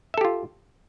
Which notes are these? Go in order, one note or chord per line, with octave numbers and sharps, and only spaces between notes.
F4 G4 A4 E5